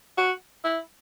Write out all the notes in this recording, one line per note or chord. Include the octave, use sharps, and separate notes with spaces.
F#4
E4